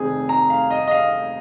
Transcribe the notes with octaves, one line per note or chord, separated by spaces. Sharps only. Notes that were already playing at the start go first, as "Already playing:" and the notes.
Already playing: F1 F2 D#3 C4 G#4
A#5
F5
D#5
D#5
F5